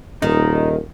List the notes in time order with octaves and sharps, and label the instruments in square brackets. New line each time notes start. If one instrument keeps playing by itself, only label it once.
[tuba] D#1 [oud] D#3 [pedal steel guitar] D#4